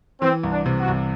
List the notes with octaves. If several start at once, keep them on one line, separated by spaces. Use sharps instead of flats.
E3 C4
C2
D4
C3
F#4
C2